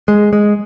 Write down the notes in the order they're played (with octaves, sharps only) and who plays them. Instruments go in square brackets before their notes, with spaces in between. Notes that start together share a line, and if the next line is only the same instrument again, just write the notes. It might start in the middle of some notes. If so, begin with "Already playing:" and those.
[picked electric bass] G#3
G#3